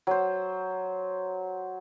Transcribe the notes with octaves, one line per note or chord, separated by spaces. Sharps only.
F#3 C5